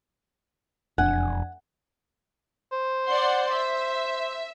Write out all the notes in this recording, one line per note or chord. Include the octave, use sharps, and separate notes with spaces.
E1 F2 D4 F#5 G#5
C5
D5 F#5 C6
E5